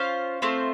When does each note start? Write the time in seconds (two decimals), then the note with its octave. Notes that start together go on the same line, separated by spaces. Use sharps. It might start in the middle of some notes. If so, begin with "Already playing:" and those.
Already playing: C#4 F4 C5 F5
0.42 A3 C4 F4 C5